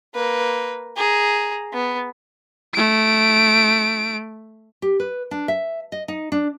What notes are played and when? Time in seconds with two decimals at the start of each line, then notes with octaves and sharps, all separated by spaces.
0.15 A#3 B4
0.96 G#4 A#5
1.73 B3
2.74 A3 D7
4.82 G4
5.00 B4
5.31 D4
5.48 E5
5.92 D#5
6.08 D#4
6.32 D4